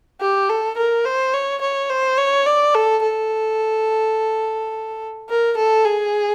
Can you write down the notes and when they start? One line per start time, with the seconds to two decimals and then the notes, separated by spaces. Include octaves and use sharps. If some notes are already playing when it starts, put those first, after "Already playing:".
0.21 G4
0.49 A4
0.77 A#4
1.06 C5
1.34 C#5
1.62 C#5
1.90 C5
2.18 C#5
2.46 D5
2.75 A4
3.03 A4
5.29 A#4
5.58 A4
5.86 G#4